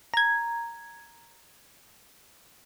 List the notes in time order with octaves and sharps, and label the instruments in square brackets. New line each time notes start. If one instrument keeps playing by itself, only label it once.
[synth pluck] A#5 G#6